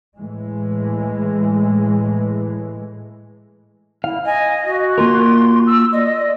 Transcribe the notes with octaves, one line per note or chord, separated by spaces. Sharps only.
A2 E3 G#3
E4 F5
D#5 G#5
F#4
A#3 F4 A#4 C6
E6
D5 D#5